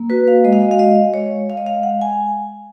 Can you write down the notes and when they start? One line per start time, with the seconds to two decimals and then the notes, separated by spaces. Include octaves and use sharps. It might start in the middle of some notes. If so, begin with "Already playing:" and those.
Already playing: A#3
0.10 F#4 B4
0.28 F5
0.44 G#3 D#5
0.53 F5
0.62 D#5
0.71 F5
0.79 G#3 D#5
1.14 G#3 C#5
1.49 G#3 F5
1.57 D#5
1.66 F5
1.83 G#3 F#5
2.02 G#5